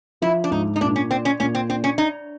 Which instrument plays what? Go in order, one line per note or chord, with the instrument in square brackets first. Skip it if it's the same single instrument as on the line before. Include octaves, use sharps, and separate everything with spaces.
[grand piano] F3 [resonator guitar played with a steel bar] E4
[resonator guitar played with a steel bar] D4
[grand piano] G#2 [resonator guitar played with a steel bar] D#4
[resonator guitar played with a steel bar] D#4
[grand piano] A#2 [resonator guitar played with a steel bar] D4
[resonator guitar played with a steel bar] C#4
[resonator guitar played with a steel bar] C4 [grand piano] D4
[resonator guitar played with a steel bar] C#4
[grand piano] A#2 [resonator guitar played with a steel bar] C#4
[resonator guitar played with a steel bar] C4
[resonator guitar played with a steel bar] C4 [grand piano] D4
[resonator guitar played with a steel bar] C#4
[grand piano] D4 [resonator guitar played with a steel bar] D#4